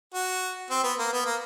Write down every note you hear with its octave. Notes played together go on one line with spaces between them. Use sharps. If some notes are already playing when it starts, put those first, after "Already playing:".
F#4
C4
B3
A#3
B3
A#3